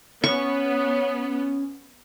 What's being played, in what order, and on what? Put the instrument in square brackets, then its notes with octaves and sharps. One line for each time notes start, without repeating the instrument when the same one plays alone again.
[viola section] B3 [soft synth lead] C#4 [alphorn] C#5 [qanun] C#6